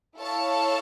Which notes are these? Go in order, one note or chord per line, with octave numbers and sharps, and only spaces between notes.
E4 A4 C#5 F5 A5